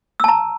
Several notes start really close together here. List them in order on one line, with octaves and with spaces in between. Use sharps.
E6 A5 A#5